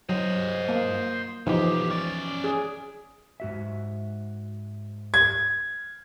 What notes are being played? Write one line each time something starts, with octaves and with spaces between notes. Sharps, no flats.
F#3 C5 D#5
A#3
B1 E3 F3 D#4 G4
C#4 D5
G#4
G#2 F#4 E5
G#6